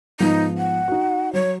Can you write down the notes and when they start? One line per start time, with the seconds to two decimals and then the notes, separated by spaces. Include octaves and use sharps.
0.20 G#2 F3 B3 D#4
0.58 F#5
0.88 D#4 F#4
1.33 F#3 C#5